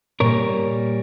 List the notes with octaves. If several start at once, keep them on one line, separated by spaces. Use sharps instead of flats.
A#2 G3 A#3 A#4 C#5